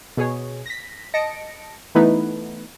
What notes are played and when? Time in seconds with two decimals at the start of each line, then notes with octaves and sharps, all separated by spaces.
0.17 B2 G#4 C#5
0.66 A#6 B6
1.14 D#5 A5 A#6 C#7 D7
1.95 E3 A3 B3 D#4 E4 B4